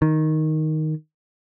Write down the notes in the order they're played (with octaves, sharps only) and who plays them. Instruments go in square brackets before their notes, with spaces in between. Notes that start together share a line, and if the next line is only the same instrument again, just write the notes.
[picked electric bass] D#3